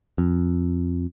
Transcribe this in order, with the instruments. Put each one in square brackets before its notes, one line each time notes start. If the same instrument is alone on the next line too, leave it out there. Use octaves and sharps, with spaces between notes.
[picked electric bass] F2